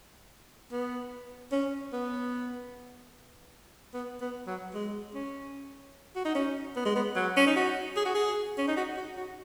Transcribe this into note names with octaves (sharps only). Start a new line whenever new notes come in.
B3
C#4
B3
B3
B3
F#3
G#3
C#4
F#4
D#4
C#4
B3
G#3
B3
F#3
C#4
D#4
F#4
G#4
F#4
G#4
C#4
D#4
F#4
F#4
F#4